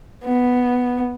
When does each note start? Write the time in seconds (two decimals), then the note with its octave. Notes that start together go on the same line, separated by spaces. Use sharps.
0.24 B3